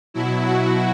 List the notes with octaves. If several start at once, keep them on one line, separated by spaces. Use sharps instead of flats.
B2 F#3 E4
F#4